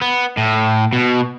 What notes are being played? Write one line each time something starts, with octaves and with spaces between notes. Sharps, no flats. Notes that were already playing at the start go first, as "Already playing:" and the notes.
B3
A2
B2